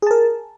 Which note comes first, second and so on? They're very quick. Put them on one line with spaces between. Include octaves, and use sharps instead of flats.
G#4 A5 A#4